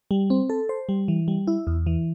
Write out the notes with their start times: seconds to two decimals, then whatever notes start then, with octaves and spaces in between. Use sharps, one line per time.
0.11 G3
0.30 C4
0.49 A4
0.69 C5
0.89 G3
1.08 E3
1.28 G3
1.47 E4
1.67 E2
1.86 E3